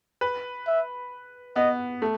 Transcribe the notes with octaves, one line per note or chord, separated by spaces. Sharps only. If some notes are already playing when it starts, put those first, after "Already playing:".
B4
E5
B3 D#5
A3